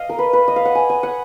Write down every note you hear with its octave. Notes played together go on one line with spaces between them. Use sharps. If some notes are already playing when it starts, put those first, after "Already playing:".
Already playing: D#5 F5
A#4
B4
B4
D#5
F5
F#5
G#5
G#5
F#5